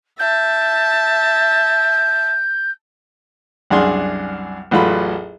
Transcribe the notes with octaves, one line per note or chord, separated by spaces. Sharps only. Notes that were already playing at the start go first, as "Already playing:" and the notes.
E5 A5 G6
C2 F#2 D4 G#4 C6
A1 E2 F#3 F4 A4 B5